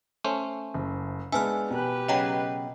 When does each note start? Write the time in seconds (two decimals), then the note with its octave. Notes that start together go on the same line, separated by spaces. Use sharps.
0.24 A3 C#4 C5
0.74 F#1
1.32 G#3 B3 D4 E5 G#5 A5 F6
1.71 B2 G4 B4
2.08 C#3 F#3 D#5 G5 A#5